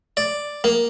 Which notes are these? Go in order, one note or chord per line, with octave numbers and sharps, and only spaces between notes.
D5
A#3